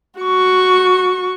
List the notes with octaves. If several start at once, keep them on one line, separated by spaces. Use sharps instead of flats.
F#4 C#6